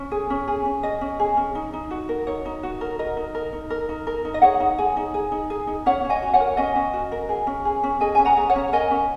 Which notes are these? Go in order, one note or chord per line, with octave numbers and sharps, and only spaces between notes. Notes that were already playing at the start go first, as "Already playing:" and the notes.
Already playing: C#4
G#4
C#4
G#4
C#4
G#4 D#5
C#4
G#4
C#4
D#4
D#4
F#4
A#4
D#4 C#5
D#4
F#4
A#4
A#4 D#5
D#4
A#4
D#4
A#4
D#4
A#4
D#4
D#5
G#4 C#5 F#5
D#4
G#4
D#4
G#4
D#4
G#4
D#4
C#4 C#5 F#5
C#4
D#5 G#5
F#4
C#5 F#5
A#4
C#4 D#5 G#5
C#4
F#4
A#4
G#4
C#4
G#4
C#4
G#4 D#5 G#5
C#4 G#5
F#5 A#5
G#4
C#5 F#5
C#4
A#4 D#5 G#5
C#4